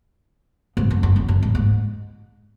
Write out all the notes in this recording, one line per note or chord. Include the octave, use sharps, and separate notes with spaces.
G#2
F#2
F#2
F#2
F#2
A2
G#2